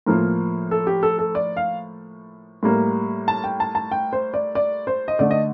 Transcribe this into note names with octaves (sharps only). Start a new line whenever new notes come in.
A2 F3 A#3 A#4
A4
G4
A4
A4
D5
F5
A2 G3 A#3
A5
G5
A5
A5
G5
C5
D5
D5
C5
D#5
D3 A3 D5
D#5